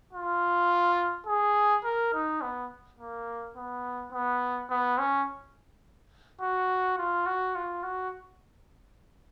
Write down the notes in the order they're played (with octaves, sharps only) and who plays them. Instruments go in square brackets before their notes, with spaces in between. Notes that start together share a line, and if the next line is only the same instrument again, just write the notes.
[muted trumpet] F4
G#4
A#4
D#4
B3
A#3
B3
B3
B3
C#4
F#4
F4
F#4
F4
F#4